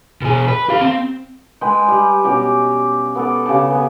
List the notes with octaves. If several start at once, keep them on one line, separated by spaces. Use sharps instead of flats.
B2 G#4
B4
G4 F5
C4
G#3 B4 G5
G3
B2 C#4 G4 D5
B3 A4 D5
C#3 G4 A5
B3 G#5